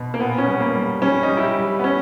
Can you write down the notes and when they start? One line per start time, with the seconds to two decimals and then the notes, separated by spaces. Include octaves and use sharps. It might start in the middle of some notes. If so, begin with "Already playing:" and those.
Already playing: B2
0.14 A#3
0.20 A#2 B3
0.38 C#4
0.47 G3 B3
0.60 A#3
0.75 G3
1.02 G3 C#4
1.23 D#4
1.29 G3
1.37 E4
1.43 G4
1.58 G3
1.79 B3
1.84 C#4